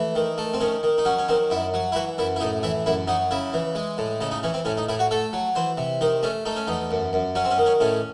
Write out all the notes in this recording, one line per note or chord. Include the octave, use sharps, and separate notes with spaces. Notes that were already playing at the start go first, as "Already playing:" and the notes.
Already playing: E3 A3
D#3
A3
C4
D#3 C#4
D#3
D#4
F#3 C#4
C#4
D#3 C4
F#2 E4
F#3
E4
E3 F#4
F#2 E4
E4
A2 D#4
E3 E4
F#2 E4
F#3 D#4
C#3 E4
E3
G#3
A2
C#3 D#4
D#4
E3 C#4
C4
A2 C#4
D#4
A2 E4
F#4
A3 A4
F#3
E3 C5
C3
D#3 D#4
A3 C#4
A3 D#4
C#4
E2 D#4
F#2
F#2
F#3 C#4
C4
C#4
D#3
C#4
A2 C#4